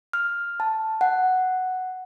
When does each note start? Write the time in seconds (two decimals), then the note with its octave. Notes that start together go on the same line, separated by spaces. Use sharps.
0.13 F6
0.60 A5
1.01 F#5